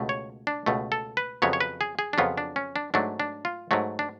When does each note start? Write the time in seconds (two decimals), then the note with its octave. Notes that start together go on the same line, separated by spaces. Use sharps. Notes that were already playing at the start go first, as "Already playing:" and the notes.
Already playing: C#2 B2 A3
0.09 C#5
0.47 D4
0.66 C#2 B2 A3
0.92 A4
1.17 B4
1.42 F2 C#3 F#3 B3 C#5
1.53 C#5
1.61 B4
1.81 G#4
1.99 G#4
2.13 D4
2.18 F2 C#3 F#3 B3 F4
2.38 D4
2.56 C#4
2.76 D4
2.94 G#2 F#3 A3 D4
3.20 D4
3.45 F4
3.71 G#2 F#3 A3
3.99 D4